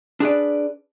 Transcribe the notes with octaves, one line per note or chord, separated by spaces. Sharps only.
D4 G#4 B4 D5